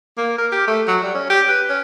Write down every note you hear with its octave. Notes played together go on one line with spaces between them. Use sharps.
A#3
A#4
G4
A3
F#3
G3
C#4
G4
B4
C#4